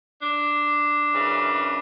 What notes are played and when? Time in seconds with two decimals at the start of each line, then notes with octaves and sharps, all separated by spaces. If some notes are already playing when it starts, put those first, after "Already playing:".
0.21 D4
1.13 F#2 C#3 E3